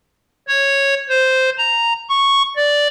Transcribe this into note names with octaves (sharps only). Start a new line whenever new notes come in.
C#5
C5
A#5
C#6
D5